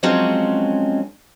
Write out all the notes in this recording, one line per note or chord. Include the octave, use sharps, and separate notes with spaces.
F3 F#3 G#3 C4 C#4